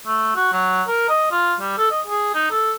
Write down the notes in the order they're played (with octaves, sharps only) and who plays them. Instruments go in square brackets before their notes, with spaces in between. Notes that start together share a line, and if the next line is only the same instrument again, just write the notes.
[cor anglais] A3
F#4
F#3
A#4
D#5
F4
G3
A4
D#5
G#4
D#4
A4